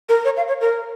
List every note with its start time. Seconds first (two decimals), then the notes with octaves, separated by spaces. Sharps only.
0.09 A#4
0.25 C#5
0.37 F5
0.48 C#5
0.61 A#4